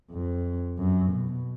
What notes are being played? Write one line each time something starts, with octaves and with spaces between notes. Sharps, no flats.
F2
F#2
B2